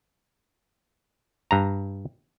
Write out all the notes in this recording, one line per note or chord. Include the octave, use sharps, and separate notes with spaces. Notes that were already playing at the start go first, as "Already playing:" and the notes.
G2 A#5